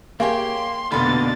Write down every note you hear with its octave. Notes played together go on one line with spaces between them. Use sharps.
A#3 G4 G#4 C#5 C6
F1 B2 D3 A#3 B5 C6 A6